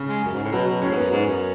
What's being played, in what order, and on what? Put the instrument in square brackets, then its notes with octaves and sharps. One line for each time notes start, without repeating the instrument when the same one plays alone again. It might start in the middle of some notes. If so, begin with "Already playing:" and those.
Already playing: [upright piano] C#3
[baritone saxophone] G#3
F#2
G#2
A2
[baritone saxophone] B2 [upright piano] F#3
[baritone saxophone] B2
[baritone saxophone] A2 [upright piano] C#4
[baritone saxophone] G#2
[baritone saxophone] F#2 [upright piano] B3
[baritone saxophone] G#2
F#2